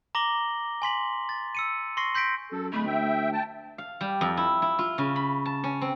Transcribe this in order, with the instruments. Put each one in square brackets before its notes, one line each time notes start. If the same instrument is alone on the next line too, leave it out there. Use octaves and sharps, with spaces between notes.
[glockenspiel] A#5 D6 A#6 F#7 G7
G#5 C6 B6 F#7
A6
E6 C#7 D#7
C6 C#6 A#6 C7
C6 G6 A#6 B6 D7
[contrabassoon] F#2 [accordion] A4
[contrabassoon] D1 [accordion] G#3 B5 [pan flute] A3
[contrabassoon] D2 [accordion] E5 G5
[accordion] G5 A5
[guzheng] F5
G3
F2
E4
E4
F4
C#3
B5
A5
C#4
C4